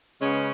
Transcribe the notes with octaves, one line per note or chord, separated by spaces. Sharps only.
C#3 G#3 B3 C#4